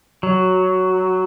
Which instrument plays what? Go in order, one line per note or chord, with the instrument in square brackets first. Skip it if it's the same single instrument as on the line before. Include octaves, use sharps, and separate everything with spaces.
[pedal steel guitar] F#3